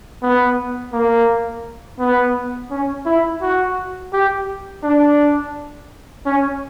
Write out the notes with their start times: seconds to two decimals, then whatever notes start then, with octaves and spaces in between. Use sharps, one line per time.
0.23 B3
0.93 A#3
1.99 B3
2.71 C#4
3.06 E4
3.41 F#4
4.13 G4
4.83 D4
6.25 C#4